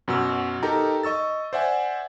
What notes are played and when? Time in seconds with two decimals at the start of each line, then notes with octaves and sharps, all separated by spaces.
0.08 F#2 B2 F#4 E6
0.63 D#4 G4 A4 A#4 G5 A#5
1.03 D#5 C#6 E6 A6
1.53 C5 D5 E5 F#5 G#5